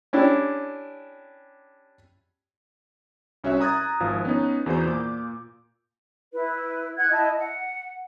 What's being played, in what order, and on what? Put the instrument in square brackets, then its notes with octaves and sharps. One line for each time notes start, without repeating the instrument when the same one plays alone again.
[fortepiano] C#4 D4 E4 G4
[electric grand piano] C2 C#4 F#4 E5 F#6
A#5 D#6 F#6 G#6 A6
G#1 F3 F5
B3 C#4 D#4
E2 E3 F#4 C5 G6
A#2 D6
[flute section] E4 B4
F#5 F#6 G#6
E4 D#5 A5
F#5